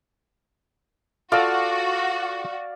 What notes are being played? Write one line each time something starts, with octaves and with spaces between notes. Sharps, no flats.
F4 F#4 A4 D5 F5